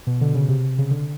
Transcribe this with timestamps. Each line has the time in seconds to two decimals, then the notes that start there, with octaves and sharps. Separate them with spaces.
0.07 B2
0.21 D3
0.35 C#3
0.48 C3
0.79 C#3
0.91 D3